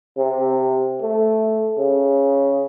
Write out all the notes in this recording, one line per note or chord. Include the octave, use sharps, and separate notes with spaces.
C3
A3
C#3